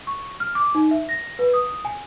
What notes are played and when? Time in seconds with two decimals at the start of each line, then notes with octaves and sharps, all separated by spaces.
0.07 C#6
0.40 F6
0.55 D6
0.75 D#4
0.91 E5
1.09 A#6
1.39 B4
1.54 D#6
1.85 G#5